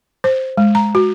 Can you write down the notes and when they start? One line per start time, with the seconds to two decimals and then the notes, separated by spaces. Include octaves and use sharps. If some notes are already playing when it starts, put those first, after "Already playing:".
0.24 C5
0.57 G#3
0.75 A#5
0.95 F#4